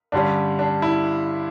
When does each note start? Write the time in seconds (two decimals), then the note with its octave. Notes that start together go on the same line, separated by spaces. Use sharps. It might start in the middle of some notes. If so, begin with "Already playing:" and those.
0.12 G2 D3 G3 C#4 D4
0.59 D4
0.82 E4